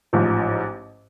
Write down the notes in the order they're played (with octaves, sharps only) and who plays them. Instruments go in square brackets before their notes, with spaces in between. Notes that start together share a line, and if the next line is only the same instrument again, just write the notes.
[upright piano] A1 G#2 F3